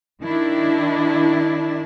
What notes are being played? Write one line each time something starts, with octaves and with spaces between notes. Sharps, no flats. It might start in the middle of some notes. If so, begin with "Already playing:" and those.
D#3 D4 E4